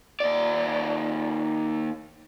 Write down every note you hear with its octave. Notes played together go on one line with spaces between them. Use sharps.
D#2 D5